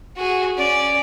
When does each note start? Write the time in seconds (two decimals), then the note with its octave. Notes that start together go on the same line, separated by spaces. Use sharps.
0.16 F#4 G#4
0.57 C#4 D5